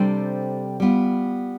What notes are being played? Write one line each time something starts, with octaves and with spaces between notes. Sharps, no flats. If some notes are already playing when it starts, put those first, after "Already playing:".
Already playing: C3 G3 D4 A4 C5
G3 B3 F4